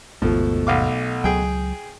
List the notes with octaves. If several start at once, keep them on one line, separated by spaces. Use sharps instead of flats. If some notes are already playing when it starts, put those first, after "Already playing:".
G#1 D#2 G#2 B2 F3 A3
B1 F5 D6
C#2 F#3 G#4 G5